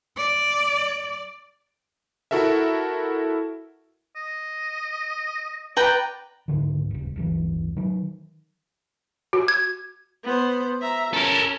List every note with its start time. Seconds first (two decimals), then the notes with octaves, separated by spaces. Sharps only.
0.17 D5
2.31 E4 F#4 A4 A#4 E5
4.16 D#5
5.77 B4 D5 G5 A#5
6.48 C#2 G#2 D3 D#3
6.91 D#1 C#2
7.16 D1 G1 E3
7.77 D#3 F#3
9.33 F#4
9.48 G#6
10.24 B3 C5
10.81 E5 A#5
11.13 C#4 A4 A#4